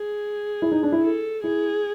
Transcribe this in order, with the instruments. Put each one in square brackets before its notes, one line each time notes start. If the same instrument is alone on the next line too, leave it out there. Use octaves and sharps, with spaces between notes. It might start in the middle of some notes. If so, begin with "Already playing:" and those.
Already playing: [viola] G#4
[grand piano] E4
D#4
D4
E4
[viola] A4
[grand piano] E4 [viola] G#4